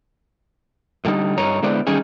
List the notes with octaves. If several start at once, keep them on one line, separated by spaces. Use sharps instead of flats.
A2 D3 G3 D#4
G2 D#4 C#5 A#5
D3 G#3 B3 E4 C5 D5
D3 D#3 G3 C#4 D#4 G#4